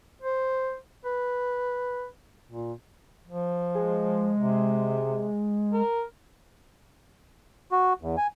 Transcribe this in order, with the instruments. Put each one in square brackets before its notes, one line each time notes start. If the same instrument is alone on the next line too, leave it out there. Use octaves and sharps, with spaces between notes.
[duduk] C5
B4
A#2
F3
[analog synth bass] G#3
[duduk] C3
A#4
[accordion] F#4
E2
G#5